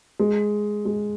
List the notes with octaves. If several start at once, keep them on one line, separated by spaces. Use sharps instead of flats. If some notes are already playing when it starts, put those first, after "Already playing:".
G#3
G#3